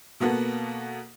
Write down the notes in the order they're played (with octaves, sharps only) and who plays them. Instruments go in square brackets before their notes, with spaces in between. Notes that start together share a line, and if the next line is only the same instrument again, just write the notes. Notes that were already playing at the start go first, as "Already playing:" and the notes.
[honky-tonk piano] B2 A#3 B3 F#4 A4